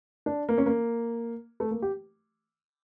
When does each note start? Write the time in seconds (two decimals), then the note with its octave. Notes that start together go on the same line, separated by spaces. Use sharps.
0.26 D4
0.49 A#3
0.58 C#4
0.66 A#3
1.60 A3
1.71 A#3
1.82 G4